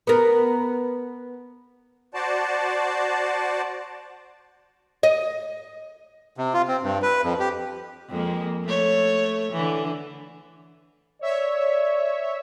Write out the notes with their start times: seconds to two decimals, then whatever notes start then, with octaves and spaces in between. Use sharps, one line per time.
0.07 B3 A#4
2.14 F#4 C5 D5 A5
5.03 D#5
6.37 C3
6.53 F4
6.68 C4
6.83 G2
7.02 B4
7.22 F2
7.39 G4
8.10 F2 G#3 A#3
8.64 A3 C#5
9.52 D3 E3
11.21 C#5 D5 E5